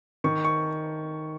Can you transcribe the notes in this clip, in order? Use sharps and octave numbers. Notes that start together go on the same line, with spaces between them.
D#3 C#6
C#6